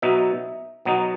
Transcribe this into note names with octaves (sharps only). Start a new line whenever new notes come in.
B2 F#3 B3 D#4 E5
B2 F#3 B3 D#4